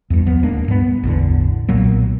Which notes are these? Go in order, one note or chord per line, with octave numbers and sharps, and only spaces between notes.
E2 G2
D#2 F3 B3
D1 G#3 A#3 D4
G2 B3
A1 E2 D3
B1 A#2 F#3 A#3